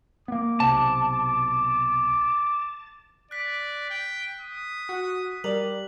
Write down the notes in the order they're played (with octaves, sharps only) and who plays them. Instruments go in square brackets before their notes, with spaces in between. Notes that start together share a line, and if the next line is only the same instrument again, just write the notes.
[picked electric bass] A#3 B3 [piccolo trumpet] D6
[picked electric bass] B1 C3 [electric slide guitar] A5
[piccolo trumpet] D5 [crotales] F#6 B6
[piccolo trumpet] G5
D#6
[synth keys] F#4
[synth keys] G3 [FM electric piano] A#4 D5 [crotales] F#7